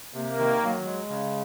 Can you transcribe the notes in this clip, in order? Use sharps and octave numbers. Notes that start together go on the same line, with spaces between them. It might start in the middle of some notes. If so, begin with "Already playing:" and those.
C3 A#3
D#3
F#3
G#3
C#3